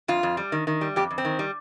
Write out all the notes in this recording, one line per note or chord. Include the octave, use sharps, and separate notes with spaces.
F2 F4
F2
G3
D#3
D#3
G3
F2 G4
F2
C4
D#3
G3